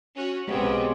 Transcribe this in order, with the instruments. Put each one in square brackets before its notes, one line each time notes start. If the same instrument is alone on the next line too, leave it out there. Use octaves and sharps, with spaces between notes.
[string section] C#4 F#4
[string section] B1 C#3 [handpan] G#3 G4 C#5 [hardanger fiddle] B3 C4